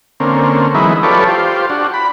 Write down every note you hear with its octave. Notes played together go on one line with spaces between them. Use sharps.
D3 A#3 C4 C#4
E3 F#3 G#3 B3 D#4 E4
F4 G4 A4 B4 C#5 D5
F4 G4 C5
D4 F#4
B5